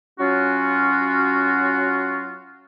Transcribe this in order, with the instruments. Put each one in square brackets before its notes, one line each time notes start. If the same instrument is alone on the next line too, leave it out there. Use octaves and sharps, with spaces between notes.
[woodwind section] F#3 C#4 F4 F#4